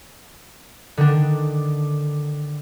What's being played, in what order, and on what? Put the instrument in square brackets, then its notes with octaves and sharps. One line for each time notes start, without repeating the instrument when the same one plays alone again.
[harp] D3 D#3 D4